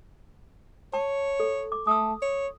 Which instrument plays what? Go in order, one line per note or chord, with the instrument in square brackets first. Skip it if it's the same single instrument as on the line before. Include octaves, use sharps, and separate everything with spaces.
[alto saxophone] C#5 [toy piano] A5
[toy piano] A4
D6
[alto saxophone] A3 [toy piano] D#6 E6
[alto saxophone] C#5